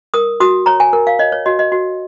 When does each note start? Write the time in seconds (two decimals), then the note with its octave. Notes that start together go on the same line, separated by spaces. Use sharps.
0.14 A#4 D#6
0.40 F#4 D#6
0.66 C#5 A#5
0.80 G#5
0.93 A#4
1.07 F5
1.19 C#5 D#5
1.32 C#5
1.46 F#4 D#5
1.59 D#5
1.72 F#4